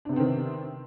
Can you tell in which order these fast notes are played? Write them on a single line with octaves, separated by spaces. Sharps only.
D4 C3 B3 C4 D#3